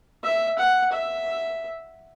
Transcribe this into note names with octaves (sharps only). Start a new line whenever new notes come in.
E5
F#5
E5